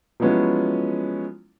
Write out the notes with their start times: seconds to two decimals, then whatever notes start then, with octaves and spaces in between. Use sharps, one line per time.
0.20 F3 F#3 G#3 B3 C#4 E4